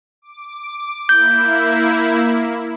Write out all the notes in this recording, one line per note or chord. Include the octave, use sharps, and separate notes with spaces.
D6
A#3 E4 G6